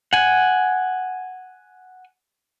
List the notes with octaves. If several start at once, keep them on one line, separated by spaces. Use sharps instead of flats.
F#5 G#5